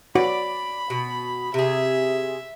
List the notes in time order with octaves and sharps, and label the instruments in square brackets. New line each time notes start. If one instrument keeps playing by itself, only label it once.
[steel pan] F#4 [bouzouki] D5 [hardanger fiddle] B5
[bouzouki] B2
[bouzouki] C3 G#4 [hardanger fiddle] E5